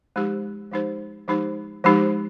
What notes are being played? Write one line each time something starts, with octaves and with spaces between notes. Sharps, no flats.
F3 G#3 D#4 G4 C5
F3 G#3 D#4 G4 C5
F3 G#3 D#4 G4 C5
F3 G#3 D#4 G4 C5